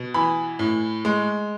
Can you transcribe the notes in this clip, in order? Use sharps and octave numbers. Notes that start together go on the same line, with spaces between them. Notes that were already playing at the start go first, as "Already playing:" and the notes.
Already playing: B2
E3 B5
A2
G#3